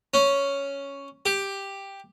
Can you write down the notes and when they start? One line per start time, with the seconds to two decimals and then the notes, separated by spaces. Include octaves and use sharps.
0.14 C#4
1.26 G4